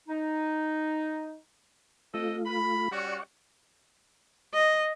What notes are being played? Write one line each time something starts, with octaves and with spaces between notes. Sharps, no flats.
D#4
A3 C4 F4 A4 D#5
B5
G3 C#4 F#4 D5 F#5 C#6
D#5